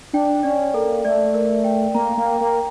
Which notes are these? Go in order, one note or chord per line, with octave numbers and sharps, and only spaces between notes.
D4 G5
C#4 D5
A#3 A4
A3 D5
A#4
G5
A#3 A#5
A#3
G5
A#3